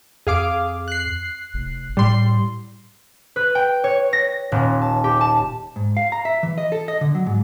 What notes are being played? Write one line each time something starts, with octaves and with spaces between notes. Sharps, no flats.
F2 G#4 F5 D6
F#6 C7
F1
A2 G3 C6
B4
G5
C#5
A#6
D#1
A5
G4
A5
G#2
F5
A#5
E5
E3
D#5
A4
D#5
D3
F#3
G#2